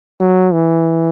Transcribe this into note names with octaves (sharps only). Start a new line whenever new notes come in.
F#3
E3